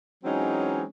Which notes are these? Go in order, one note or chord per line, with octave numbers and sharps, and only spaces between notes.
E3 F#3 G#3 C4 C#4 D#4